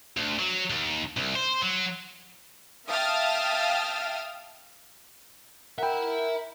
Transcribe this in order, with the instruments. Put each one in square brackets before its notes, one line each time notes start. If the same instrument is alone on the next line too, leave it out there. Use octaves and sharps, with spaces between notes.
[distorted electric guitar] D2
F#3
D#2
C2
C5
F#3
[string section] E5 F5 G5 A5 D#6 F6
[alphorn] A#4 [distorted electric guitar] E5 B5 [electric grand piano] F#5 G5